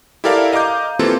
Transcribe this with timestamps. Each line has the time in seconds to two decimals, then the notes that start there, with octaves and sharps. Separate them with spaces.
0.24 E4 G4 A4 A#4 D5 F5
0.52 D#5 F5 A#5 D6 G6
0.99 E3 A#3 C4 F4 G4 A4